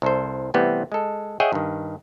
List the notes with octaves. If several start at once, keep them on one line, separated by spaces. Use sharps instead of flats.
C2 A4 C5
C3 E3 G3 A3 B3 C4
G#3 A4
G#4 C#5 D#5 E5 F#5 G5
G2 D#3